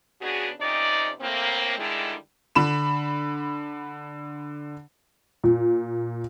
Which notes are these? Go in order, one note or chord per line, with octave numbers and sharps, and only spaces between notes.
C#3 B3 D4 F#4 G#4
F2 C3 C#4 D#4 D5
A2 A#3 C4
D3 D#3 G3 G#3 D4 E4
D3 B5 E7
A#2